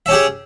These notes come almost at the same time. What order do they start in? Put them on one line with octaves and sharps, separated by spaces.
E5 C#4 G4 G#4